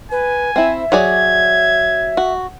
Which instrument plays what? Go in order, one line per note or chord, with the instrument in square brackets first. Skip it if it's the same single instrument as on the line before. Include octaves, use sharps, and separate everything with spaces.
[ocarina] B4 [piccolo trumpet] G#5
[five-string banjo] C4 E4 [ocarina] E5
[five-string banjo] F#3 G#4 D5 [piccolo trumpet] G#6
[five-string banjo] F#4